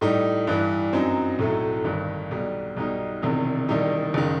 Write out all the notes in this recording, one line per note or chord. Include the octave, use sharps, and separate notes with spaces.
A2 G3 D#4
G2 E3 G3
F#2 F#3 C4 D#4
B1 A2 F#3 A3
G1 G2 D#3
B1 B2 G3
B1 B2 G3 D#4
E1 E2 C3 D#3
E1 E2 D#3 G3 D#4
F#1 D#3